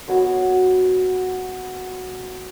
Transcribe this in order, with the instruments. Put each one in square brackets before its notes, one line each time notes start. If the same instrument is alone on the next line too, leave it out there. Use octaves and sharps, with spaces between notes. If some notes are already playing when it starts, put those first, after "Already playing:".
[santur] B3 F#4 C#5